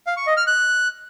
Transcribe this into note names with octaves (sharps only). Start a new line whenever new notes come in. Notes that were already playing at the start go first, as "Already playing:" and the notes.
F5
C#6
D#5
F6
F#6